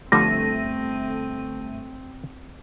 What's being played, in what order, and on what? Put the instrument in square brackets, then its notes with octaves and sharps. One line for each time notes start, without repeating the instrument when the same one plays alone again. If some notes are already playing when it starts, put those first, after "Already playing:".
[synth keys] G1 A3 D#7 [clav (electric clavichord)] D3 F3 G3 [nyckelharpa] C4 [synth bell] A#6